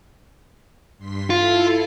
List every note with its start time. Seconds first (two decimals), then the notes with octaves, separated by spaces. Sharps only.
0.98 G2 C6 B6
1.30 E4 F4 A4